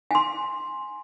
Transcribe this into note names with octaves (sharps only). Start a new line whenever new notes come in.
G#5 C6